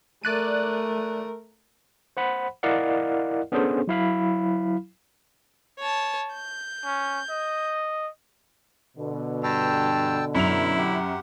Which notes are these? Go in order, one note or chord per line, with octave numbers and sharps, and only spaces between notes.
A3 A#4 D5 F#6 D#7
C5 F#5 B5
E4 A#4 D5 D#5 F5 F#5
B3 C#4 D4 G#4 A4 C5
F#3 E4 F5 B5
C#5 A5
G6
C#4
D#5
B2 D3
G2 G5 A5 E6
F#2 E4 F7
G4 F#5